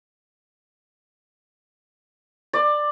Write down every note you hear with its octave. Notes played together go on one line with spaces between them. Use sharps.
D5